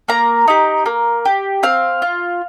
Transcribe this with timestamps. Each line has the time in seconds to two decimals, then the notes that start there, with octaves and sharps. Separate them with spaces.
0.08 A#3 A#5
0.48 D#4 G4
0.86 A#3
1.25 G4
1.63 C4 F5
2.02 F4